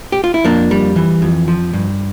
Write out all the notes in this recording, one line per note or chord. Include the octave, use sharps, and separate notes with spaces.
G4
F4
E4
F2 A#3 D4
G3
E3
F2
F3
G2